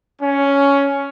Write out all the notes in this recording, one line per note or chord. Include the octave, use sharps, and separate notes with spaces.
C#4